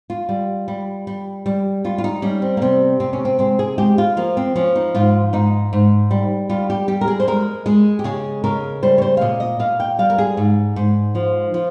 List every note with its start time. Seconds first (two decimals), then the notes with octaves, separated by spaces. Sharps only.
0.10 F4
0.29 G3
0.68 G3
1.07 G3
1.46 G3
1.84 G3 F4
1.98 F4
2.04 D#4
2.22 G3 C#4
2.42 C4
2.57 A#3
2.62 C3 C4
3.00 C3 C4
3.13 C#4
3.25 C4
3.39 G#3 C4
3.59 G#4
3.78 G#3 G4
3.98 F4
4.17 F3 A#3
4.37 C4
4.56 F3 C#4
4.76 D#4
4.95 G#2 F4
5.33 G#2 D#4
5.73 G#2
6.11 G3
6.49 G3 F4
6.70 G4
6.88 G3 G4
7.01 A#4
7.08 G#4
7.20 C5
7.28 G#3 A#4
7.66 G#3 G#4
7.99 G4
8.04 C#3 G#4
8.44 C#3 A#4
8.83 G3 C5
8.98 C#5
9.02 C5
9.17 F5
9.21 A#2 D#5
9.40 D#5
9.59 A#2 F5
9.80 G5
9.99 G3 F5
10.10 A#4
10.18 G#4
10.37 G#2
10.76 G#2
11.15 F3
11.54 F3